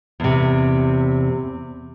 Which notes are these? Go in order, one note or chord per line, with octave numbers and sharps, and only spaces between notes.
E2 C3